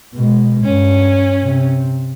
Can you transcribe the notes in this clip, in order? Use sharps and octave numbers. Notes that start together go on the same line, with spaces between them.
B2 G#3
G2 C#4
C3